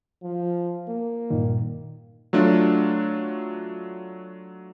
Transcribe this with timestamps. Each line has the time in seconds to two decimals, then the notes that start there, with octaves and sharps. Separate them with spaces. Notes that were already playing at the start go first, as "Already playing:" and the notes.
0.23 F3
0.88 A#3
1.30 G2 A#2 D#3
2.33 F#3 A3 D4 F4